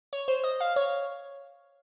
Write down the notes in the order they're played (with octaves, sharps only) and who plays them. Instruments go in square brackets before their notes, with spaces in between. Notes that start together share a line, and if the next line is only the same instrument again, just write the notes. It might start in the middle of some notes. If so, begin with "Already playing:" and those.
[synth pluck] C#5
C5
D#5
F5
C#5